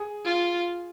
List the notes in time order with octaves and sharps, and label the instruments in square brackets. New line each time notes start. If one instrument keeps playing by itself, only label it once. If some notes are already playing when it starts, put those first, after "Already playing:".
Already playing: [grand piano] G#4
[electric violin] F4